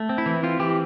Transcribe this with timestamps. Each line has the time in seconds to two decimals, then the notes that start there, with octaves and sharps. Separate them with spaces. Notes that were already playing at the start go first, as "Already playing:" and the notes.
Already playing: A3
0.09 C4
0.18 E4
0.26 E3
0.43 C4 F4
0.59 E3 G4